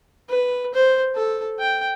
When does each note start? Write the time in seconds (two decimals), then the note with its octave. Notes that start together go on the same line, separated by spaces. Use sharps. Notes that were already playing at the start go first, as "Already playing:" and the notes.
0.29 B4
0.74 C5
1.16 A4
1.59 G5